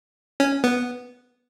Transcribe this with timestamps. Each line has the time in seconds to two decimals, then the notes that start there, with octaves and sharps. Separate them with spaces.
0.40 C#4
0.64 B3